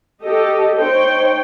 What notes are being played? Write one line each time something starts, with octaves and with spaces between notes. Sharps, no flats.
G4 A4 D#5
D#4 C5 C#5 G5